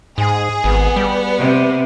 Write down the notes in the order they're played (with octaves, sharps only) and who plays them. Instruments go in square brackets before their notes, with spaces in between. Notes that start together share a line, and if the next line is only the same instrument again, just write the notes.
[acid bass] G#2 [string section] G#4
[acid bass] G#1 [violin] B3
[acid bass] G3
[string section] C3